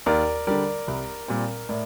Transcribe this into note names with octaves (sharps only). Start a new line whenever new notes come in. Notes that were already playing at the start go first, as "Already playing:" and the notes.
D#2 A#4 D5
D3 G3 A#4 D5
C2
A#2 G3 C4
A2 A#4 D5